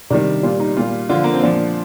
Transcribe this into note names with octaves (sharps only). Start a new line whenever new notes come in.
C3 D#3 G3 D4
A#2 G3 F4
D#4
A#2 G3 F4
D3 F3 F4
A#3
C4
A#2 F3 D4